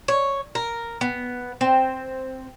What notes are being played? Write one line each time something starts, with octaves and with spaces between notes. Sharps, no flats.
C#5
A#4
B3
C4